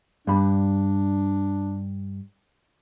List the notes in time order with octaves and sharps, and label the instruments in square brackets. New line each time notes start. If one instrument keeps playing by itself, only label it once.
[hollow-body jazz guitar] G2 B5 [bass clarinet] D4